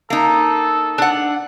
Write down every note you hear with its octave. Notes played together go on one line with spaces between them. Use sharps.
A#3 D#4 A4
D4 F#5